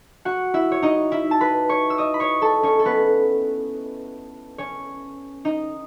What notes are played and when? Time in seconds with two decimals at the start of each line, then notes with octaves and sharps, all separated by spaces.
0.25 F#4 F#5
0.54 E4 E5
0.72 C#5
0.82 D#4 D#5
1.12 E4 E5
1.31 A5
1.41 B4 B5
1.69 C#5 C#6
1.90 E6
1.98 D#5 D#6
2.14 B5
2.20 C#5 C#6
2.42 A4 A5
2.63 C#4 C#5
2.79 A4
2.85 B3 B4
4.58 C#4 C#5
5.45 D#4 D#5